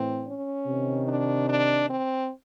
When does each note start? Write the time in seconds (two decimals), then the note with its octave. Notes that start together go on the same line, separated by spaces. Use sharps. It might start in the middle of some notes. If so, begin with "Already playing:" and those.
Already playing: A2 E3 C4
0.27 C#4
0.67 C3 D#3
1.07 D4
1.49 D4
1.89 C4